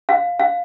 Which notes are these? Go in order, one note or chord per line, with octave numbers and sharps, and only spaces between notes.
F5
F5